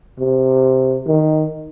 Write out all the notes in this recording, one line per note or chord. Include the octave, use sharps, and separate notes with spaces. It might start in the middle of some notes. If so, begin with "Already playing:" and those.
C3
D#3